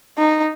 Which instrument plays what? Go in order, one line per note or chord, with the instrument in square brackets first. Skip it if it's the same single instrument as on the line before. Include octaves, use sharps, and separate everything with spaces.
[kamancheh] D#4